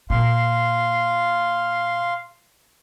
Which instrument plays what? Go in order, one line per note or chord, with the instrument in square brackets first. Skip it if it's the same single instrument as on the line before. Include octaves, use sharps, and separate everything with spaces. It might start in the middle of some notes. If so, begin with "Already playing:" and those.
[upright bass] A#2 [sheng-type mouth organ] F5 C6